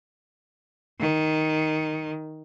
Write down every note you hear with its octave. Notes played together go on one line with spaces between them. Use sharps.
D#3